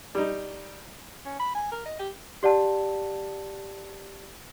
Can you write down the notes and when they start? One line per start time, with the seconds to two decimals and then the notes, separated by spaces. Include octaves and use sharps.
0.15 G3 D#4
1.25 C#4
1.39 B5
1.55 G#5
1.72 A#4
1.86 D#5
1.99 G4
2.43 G4 D5 F#5 A5